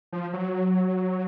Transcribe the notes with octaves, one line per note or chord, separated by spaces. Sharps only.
F3
F#3